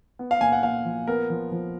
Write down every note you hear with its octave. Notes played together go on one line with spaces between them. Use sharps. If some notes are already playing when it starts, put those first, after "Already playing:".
B3
F5
A#2 G#5
F#5
A#2 F5
F3
B3 A#4
F3
F3